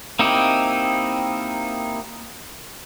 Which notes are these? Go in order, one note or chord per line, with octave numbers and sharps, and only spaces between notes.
A#3 C4 D#4 E4 G4